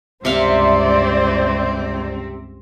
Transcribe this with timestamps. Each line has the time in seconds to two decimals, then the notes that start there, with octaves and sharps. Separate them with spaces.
0.25 C#2 G2 C3 C4 C5 D5 E5 F5